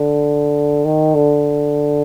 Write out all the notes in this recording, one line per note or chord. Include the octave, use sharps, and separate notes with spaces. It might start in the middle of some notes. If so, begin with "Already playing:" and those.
Already playing: D3
D#3
D3